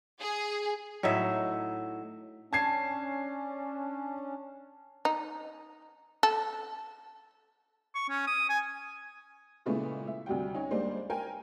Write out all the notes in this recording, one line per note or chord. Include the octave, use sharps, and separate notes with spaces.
G#4
A2 F#3 D#4 E5
C#4 D4 A5 G#6 C7
D#4
A4
C#6
C#4
D#6
G#5
A#2 C#3 G#3 A3 B3 E4
E5
D2 C3 G3 F#4 G5
C#4 D#4
G3 G#3 A#3 D4 C5
A#4 G5 G#5